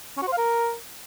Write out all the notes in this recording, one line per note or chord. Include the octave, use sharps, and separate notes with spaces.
C#4
F#4
C5
F5
A#4